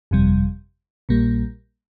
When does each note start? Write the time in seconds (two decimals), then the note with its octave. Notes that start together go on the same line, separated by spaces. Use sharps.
0.11 G1 F2 C3 G3
1.09 A#1 A#2 G3 A#3